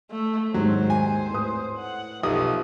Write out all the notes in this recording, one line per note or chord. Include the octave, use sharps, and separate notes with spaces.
A3
D#2 G#2 F#3 C5
G#5
A2 B4 D#6
F#5
B1 F3 G4 A4 E5 D#6